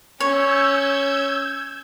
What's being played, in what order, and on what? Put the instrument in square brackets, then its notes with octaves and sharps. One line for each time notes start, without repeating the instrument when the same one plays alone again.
[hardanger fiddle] C#4 [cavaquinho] C#5 [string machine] E6 G6 G#6